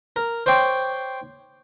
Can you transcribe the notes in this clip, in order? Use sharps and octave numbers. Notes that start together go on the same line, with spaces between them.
A#4
C5 C#5 G5 C6 D6